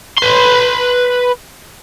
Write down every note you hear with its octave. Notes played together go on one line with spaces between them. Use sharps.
B4 C6